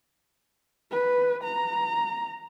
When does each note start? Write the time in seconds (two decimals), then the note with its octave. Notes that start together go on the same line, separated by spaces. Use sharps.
0.91 B4
1.43 A#5